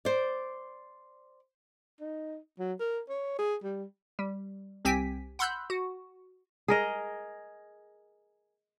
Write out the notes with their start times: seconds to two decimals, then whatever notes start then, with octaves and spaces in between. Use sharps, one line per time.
0.05 C5 D5
2.00 D#4
2.59 F#3
2.80 A#4
3.09 C#5
3.38 G#4
3.63 G3
4.19 G3
4.85 C2 C4 G4 G5 G#5 B6
5.39 F#5 B5 C6 E6 F#6 G6
5.70 F#4
6.68 G#4 A#4 D#5